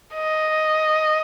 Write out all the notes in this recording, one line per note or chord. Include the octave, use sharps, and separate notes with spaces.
D#5